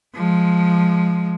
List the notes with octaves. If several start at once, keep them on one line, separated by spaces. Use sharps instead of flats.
F3 G#3